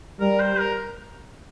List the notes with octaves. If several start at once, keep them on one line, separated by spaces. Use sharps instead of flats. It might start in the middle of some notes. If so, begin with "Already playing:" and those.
G3 A#4
C5
A#4